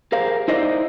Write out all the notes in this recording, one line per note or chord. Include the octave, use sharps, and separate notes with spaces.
G4 G#4 A#4 C5 F5
D#4 E4 C5 D5 D#5